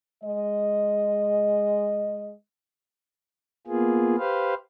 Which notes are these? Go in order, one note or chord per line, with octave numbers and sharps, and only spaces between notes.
G#3 D#5
A#3 B3 F4 G#4
G4 B4 C5 F5